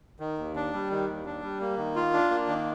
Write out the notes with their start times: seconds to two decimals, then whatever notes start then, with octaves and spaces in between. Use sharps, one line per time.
0.20 D#3
0.38 D#2
0.56 D4
0.73 G3
0.91 D#3
1.08 D#2
1.25 D4
1.42 G3
1.61 A#3
1.77 D#3
1.96 F4
2.13 D4
2.30 A#3
2.48 D#3